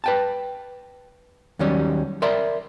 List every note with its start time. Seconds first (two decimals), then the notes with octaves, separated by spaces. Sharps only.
0.04 B4 G5 A5
1.59 D#2 D#3 F#3 G3 C#4
2.22 A#4 D5 E5 B5 C6